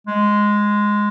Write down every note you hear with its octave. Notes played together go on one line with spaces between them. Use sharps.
G#3